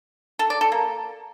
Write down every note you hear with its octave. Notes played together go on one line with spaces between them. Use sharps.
A4
D5
A4
A#3